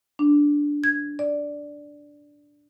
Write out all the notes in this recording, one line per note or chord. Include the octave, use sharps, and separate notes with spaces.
D4
G#6
D5